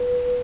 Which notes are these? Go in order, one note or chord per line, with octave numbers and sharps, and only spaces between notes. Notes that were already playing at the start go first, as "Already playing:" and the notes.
Already playing: B4